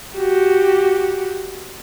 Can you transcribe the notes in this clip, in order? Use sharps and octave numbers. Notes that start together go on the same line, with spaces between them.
F#4 G4